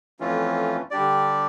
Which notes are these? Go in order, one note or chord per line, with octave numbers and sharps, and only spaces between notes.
F2 E3 A3 C#4 F4
D3 G3 D4 G4 D5